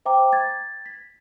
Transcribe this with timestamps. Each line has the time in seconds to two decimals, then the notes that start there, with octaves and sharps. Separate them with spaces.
0.06 C5 E5 G5 A#5 D6
0.33 G#6 A6
0.86 B6